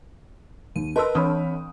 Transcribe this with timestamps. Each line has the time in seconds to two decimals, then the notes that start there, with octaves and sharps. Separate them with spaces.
0.76 D#2 D#7
0.96 A#4 B4 D#5 A5 C6 E6
1.15 E3 C4 D4 C#5 B5 D#6